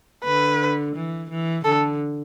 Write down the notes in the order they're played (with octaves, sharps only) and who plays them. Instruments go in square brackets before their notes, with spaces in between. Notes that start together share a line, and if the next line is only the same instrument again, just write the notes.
[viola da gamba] D3 [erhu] B4
[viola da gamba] E3
E3
[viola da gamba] D3 [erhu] A4